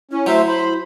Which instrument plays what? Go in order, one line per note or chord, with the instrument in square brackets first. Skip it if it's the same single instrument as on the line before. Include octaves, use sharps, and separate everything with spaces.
[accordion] C#4 [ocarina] E4
[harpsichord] F#3 [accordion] A3 C5 E5
[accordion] C5 B5